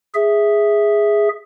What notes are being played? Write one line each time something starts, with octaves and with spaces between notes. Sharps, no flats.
G#4 E5